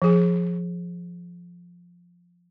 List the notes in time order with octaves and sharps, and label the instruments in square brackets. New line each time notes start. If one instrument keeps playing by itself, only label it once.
[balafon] F3 G#4